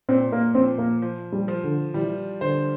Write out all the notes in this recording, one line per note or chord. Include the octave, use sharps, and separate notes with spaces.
A#2 C4
A#3
F3 C4
A#3
F3
G3
F3
D3
E3 G3
D3 C5